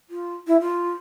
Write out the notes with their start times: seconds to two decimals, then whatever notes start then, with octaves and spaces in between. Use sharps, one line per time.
0.10 F4
0.47 E4
0.61 F4